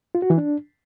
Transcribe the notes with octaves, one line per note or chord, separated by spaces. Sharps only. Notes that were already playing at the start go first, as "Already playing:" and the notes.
F4
F#4
E3
D4